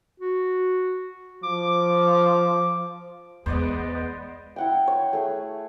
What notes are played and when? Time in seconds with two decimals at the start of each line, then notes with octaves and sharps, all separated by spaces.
0.20 F#4
1.43 F3 D6
3.46 E2 G#3 B3 C5 D5 D#5
4.56 E4 F#5 G5
4.88 C#5
5.13 A3 G#4